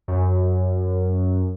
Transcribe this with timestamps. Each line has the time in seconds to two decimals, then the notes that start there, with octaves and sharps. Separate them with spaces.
0.08 F#2